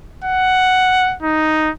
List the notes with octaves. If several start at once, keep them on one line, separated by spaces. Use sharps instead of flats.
F#5
D#4